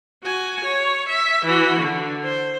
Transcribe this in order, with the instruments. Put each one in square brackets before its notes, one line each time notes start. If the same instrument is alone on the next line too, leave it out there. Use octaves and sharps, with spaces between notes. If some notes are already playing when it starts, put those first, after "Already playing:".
[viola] F#4 G#5
C#5
E5
E3 F#4
D3
C5